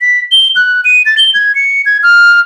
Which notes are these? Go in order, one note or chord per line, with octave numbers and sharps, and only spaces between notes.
B6
G7
F#6
D#7
A6
G7
G#6
C#7
G#6
F6